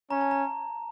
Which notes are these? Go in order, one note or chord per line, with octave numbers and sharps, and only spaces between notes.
C#4 A#5
A5
A#5